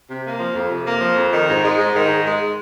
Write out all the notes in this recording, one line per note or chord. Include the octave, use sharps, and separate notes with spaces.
C3
A#3
F3
F2
C3
A#3
F3
F2
D#3
G#2
G#3
G#2
D#3
G#2
G#3